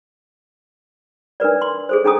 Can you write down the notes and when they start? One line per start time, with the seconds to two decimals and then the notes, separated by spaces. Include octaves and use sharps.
1.40 D4 A#4 B4 D5
1.62 C6
1.89 G#4 A4 C5
2.04 C#4 D4 G#4 A4 A#5 D#6